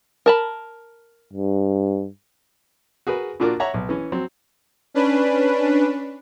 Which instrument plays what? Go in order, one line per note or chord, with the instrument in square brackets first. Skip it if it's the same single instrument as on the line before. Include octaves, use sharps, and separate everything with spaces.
[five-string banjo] A#4 A5 B5
[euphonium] G2
[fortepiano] F#4 G#4 A#4 B4
A#2 D4 F4 F#4 A#4 D6
C#5 E5 F#5 A#5
B1
E3 C#4
F#3 C4
[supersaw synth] C#4 D4 B4